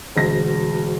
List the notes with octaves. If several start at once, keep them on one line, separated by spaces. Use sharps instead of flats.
E1 D2 A#6